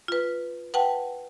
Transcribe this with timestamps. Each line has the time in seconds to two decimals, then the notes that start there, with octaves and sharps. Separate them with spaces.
0.08 F4 B4
0.74 B4 F#5 G5 A5